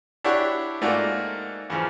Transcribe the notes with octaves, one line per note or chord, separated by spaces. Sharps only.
D4 E4 F#4 G4 C#5 F#5
G#2 A3 A#3 F4 F#4 D5
E2 C#3 F3